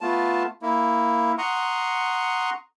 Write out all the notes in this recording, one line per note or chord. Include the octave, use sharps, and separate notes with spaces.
A3 B3 F4 A5
A#3 E4
F#5 A#5 C6 C#6 D#6